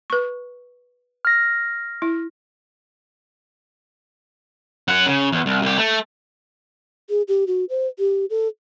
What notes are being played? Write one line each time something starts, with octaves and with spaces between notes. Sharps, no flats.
B4 C#6
F6 A#6
E4
F#2 F#5
C#3
E2
C2
C2 G4
A3
G#4
G4
F#4
C5
G4
A4